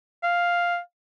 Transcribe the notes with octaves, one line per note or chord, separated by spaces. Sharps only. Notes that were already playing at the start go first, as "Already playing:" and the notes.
F5